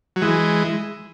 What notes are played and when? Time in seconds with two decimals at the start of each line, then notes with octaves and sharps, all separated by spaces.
0.16 F#3
0.22 E3 G#3